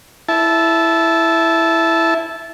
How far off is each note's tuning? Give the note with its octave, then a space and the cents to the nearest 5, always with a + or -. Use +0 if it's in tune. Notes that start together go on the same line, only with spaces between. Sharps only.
E4 +0 A5 -15